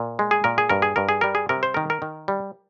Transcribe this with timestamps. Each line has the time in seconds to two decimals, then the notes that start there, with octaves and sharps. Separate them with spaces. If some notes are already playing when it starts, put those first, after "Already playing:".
Already playing: A#2
0.19 G#3
0.31 G#4
0.44 A#2 A#4
0.58 G#4
0.69 G2 A#4
0.82 G#4
0.96 G2 A#4
1.09 G#4
1.21 G3 A#4
1.35 G#4
1.49 C3 A#4
1.63 C5
1.74 D#3 A#4
1.90 A#4
2.02 D#3
2.28 G3